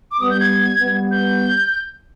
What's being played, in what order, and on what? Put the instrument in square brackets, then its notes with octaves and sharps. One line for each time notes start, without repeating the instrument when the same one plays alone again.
[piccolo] D6
[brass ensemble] G3 B3 [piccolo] D#6
[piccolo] G6
G#6
[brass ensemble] G3 B3
[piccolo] G6